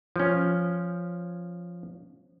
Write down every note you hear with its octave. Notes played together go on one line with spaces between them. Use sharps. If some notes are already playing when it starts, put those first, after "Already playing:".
F3 C#4